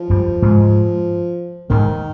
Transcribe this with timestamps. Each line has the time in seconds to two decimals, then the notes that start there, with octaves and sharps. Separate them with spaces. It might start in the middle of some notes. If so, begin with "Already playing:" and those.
Already playing: F3
0.10 G2 G3
0.42 G#2 G#3
1.70 G#2 D#3 G#3